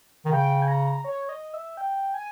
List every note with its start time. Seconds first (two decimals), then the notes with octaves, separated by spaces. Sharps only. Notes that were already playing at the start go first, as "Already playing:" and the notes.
0.25 D#3
0.31 C#3 G5
0.62 G#5
0.68 A#5
1.04 C#5
1.29 D#5
1.54 E5
1.77 G5
2.14 G#5